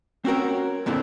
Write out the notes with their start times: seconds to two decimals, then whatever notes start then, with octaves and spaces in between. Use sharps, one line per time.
0.25 C4 C#4 F#4 A#4 C#5
0.86 F2 A#2 D3 C4 E4